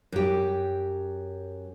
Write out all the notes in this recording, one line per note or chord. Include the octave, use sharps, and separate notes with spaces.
F#2 G4